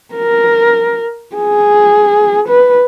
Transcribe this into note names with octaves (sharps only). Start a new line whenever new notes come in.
A#4
G#4
B4